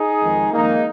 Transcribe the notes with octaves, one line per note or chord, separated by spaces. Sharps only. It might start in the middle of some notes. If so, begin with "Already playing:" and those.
Already playing: D#4 G#4
F2 D#3 G#3
F2 D#3 G#3 A#3 D#4